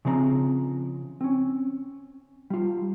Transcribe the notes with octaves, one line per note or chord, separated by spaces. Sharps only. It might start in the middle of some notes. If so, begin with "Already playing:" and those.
C#3 F3 C4 D5 A#5
C4 C#4
G3 F4